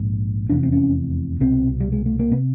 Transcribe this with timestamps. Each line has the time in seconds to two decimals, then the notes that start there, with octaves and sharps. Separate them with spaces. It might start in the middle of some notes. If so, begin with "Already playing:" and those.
Already playing: A#1 G#2
0.49 F1 E2 C3 D4
0.63 C4
0.72 C#4
1.40 C2 B2 C4
1.80 G3
1.92 G#3
2.06 A3
2.19 A#3
2.32 C3 B3